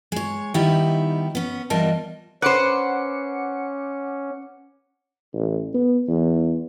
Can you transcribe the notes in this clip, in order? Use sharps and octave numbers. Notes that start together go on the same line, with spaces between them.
G#3 C#5
D#3 G3 B3 D#4 E4 G4
B3 C#4
E2 G3 F4 A#4 D#5 A5
C#4 B4 C5 F#5 D6 C#7
A1
B3
E2